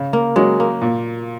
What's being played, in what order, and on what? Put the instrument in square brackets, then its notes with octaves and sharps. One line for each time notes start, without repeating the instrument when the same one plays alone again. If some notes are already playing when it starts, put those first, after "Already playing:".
Already playing: [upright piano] C#3
[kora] A#3
[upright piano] F#3 C#4 F#4 [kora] G#3
[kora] A#3
[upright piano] A#2